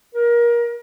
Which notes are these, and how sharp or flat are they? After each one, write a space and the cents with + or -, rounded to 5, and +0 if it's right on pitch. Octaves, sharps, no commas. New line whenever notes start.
A#4 +25